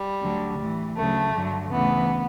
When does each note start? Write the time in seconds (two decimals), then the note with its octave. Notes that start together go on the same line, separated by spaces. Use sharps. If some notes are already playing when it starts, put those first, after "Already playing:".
Already playing: G3
0.22 D2 D3 F#3
0.59 A2 E3
0.97 D2 C#3 F#3 A3
1.34 G2 D3 F#3
1.71 D2 C#3 E3 B3